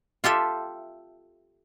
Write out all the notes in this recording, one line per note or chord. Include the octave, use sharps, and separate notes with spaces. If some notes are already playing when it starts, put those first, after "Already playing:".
F4 G4 A4 E5